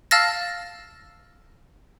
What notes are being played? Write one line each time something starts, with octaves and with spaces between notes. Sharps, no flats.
F5 A5 E6 F6 A6 A#6